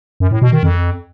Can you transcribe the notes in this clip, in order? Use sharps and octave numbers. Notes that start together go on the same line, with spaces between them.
F#2
A2
B2
D#3
F2